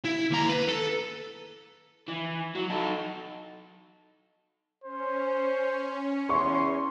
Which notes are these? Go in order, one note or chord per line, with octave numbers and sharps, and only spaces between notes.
E4
D#2 A#5
B4
A4
E3
F#3
D#4 A4
C#4 C5
E2 C6 C#6